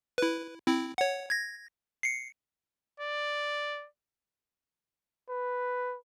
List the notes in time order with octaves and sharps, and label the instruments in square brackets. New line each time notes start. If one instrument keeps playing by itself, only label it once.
[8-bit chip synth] E4 B4
C4 E4
C#5 F#5
G#6 A#6
C7 C#7
[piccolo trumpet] D5
[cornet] B4